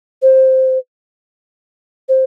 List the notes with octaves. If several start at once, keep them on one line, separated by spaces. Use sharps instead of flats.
C5
C5